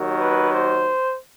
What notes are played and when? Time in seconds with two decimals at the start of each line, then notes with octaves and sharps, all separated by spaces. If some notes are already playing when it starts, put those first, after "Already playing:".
Already playing: D#2 D#3 F#3
0.19 B4
0.54 C5